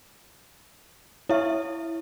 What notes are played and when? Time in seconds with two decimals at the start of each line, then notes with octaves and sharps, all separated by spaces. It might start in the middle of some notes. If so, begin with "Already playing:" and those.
1.29 E4 C#5 E5 F5